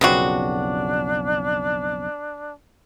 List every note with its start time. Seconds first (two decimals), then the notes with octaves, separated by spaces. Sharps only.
0.01 B1 F2 C#3 B3 C4 D4 F#4